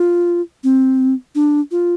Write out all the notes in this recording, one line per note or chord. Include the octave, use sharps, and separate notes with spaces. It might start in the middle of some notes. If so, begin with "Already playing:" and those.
Already playing: F4
C4
D4
F4